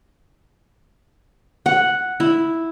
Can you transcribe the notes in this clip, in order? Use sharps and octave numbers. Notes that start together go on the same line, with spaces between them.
F#5
E4